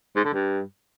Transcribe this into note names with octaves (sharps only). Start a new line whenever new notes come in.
G#2
D3
G2